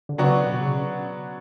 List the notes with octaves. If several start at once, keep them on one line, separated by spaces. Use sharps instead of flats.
D3
C#3 F#3 B3 D4 F#4
B2
C#3